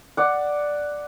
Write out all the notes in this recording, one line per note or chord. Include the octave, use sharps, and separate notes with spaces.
D5 F#5